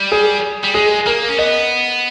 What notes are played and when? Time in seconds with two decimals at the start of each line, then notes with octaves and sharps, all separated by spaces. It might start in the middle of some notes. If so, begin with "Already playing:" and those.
Already playing: G3
0.12 G#4
0.64 G3
0.75 G#3 G#4
1.06 A#3 A#4
1.29 C#4
1.39 B3 D#5